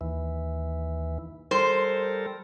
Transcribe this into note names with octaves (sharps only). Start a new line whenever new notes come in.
D#2 E3
G3 A4 A#4 C5